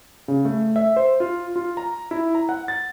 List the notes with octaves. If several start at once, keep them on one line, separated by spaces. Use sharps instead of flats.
C#3
A3
E5
C5
F4
F4
A#5
E4
A#5
F#5
A6